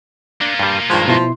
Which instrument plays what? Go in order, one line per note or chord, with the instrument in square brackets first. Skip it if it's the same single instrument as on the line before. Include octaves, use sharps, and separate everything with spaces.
[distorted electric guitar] A#3 F4 [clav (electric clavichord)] D4
[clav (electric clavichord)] G2 G3
[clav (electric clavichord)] G2 D#3 G#3 [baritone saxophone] F3
[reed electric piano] B2 E4 C6 [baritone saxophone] F3